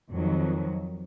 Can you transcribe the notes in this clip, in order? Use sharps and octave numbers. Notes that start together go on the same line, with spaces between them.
F2 D#3 F#3